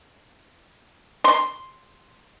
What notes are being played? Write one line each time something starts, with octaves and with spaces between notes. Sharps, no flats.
C6